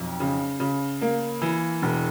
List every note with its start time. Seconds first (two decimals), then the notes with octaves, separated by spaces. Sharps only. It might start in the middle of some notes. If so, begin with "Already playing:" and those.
Already playing: B1 F2
0.20 C#3
0.60 C#3
1.01 A#3
1.42 E3
1.82 E1